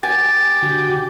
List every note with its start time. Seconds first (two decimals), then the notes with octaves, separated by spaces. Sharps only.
0.03 G4 G#5 A6
0.62 D3 F#4